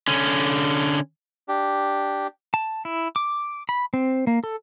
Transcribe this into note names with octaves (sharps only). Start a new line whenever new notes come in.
D3 C#4
D4 G4
A5
E4
D6
B5
C4
A#3
A4